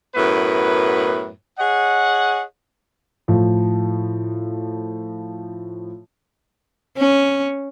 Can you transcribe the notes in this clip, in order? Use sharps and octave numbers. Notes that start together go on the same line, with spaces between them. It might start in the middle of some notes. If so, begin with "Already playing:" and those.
F#2 A2 B3 B4
G#4 C#5 D#5 F#5
A2 F3
C#4